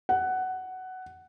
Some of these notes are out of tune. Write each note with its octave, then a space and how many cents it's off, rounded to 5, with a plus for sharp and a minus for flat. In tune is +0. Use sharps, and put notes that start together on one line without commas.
F#5 +10